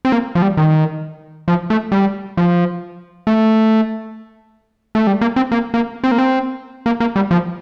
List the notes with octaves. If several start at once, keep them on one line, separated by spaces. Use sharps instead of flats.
C4
A#3
F3
G3
D#3
F3
A3
G3
F3
A3
A3
G3
A#3
C4
A#3
A#3
C4
A#3
C4
A#3
A#3
G3
F3